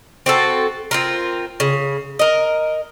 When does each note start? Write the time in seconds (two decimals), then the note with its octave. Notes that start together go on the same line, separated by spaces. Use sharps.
0.26 C4 F#4 A4
0.91 C4 F4 A#4
1.60 C#3
2.19 A#4 D#5